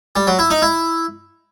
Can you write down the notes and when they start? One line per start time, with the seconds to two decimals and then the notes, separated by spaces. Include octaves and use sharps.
0.16 G3
0.27 F#3
0.39 E4
0.50 D#4
0.62 E4